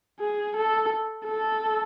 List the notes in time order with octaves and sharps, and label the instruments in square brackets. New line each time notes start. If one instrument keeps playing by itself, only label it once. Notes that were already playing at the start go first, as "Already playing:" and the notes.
[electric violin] G#4
A4
A4